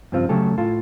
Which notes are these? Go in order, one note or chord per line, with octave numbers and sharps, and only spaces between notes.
G2 C#3 F3 C4 F4
C#3 F#3 A3 G4 A4
A2 F4 A4